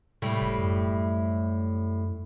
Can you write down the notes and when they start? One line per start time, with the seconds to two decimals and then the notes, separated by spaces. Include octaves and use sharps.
0.22 A2 C3 G3
0.41 F1
0.58 F#2